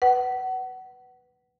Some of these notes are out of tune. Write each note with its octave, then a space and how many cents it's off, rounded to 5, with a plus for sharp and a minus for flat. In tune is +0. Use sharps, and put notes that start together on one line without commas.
B4 +0 F#5 +25